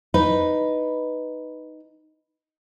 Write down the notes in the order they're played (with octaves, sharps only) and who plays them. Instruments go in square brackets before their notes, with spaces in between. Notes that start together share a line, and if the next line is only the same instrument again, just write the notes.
[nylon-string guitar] D#4 B4